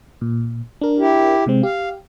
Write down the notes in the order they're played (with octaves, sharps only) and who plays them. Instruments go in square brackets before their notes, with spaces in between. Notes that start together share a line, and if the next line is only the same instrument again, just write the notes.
[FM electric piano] A#2
D4 A#4
[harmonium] E4 G4
[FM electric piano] C3 G#3 C4
[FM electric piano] G4 [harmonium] F5